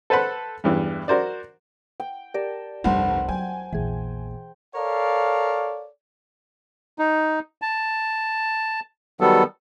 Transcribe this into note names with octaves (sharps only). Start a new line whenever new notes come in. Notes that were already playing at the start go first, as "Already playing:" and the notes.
A4 B4 C5 F#5 B5
E2 G2 E3
F#4 A#4 C5 D5
G5
G4 A#4 D5 A5
F1 C2 G2 D4 C5 F#5
F#3 G5 G#5
A#1 E2 E3 G#4
A4 A#4 C#5 D5 F5
D#4
A5
D#3 F#3 G3 B3 A4